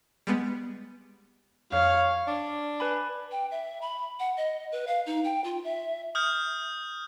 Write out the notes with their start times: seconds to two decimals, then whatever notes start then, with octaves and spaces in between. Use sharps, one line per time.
0.27 G3 G#3 B3
1.72 F2 C#5 F5
2.27 D4
2.80 B4 G#5 B5
3.32 G5
3.51 E5
3.81 B5
4.20 F#5
4.37 D#5
4.72 B4
4.87 F5
5.06 D#4
5.24 G5
5.44 F4
5.64 E5
6.15 D#6 F6 G6